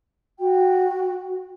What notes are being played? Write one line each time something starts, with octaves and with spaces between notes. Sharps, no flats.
F#4 G5